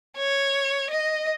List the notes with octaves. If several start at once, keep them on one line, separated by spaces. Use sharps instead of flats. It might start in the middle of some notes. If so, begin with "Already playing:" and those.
C#5
D#5